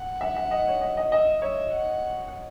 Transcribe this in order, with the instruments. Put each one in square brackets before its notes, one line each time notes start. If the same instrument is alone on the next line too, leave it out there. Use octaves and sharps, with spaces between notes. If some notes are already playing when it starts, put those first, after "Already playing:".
Already playing: [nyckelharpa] F#5
[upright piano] E5
E5
D#5
C#5
D#5
D#5
[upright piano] D#5 [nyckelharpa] E5
[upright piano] C#5 [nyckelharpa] E5
[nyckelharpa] F#5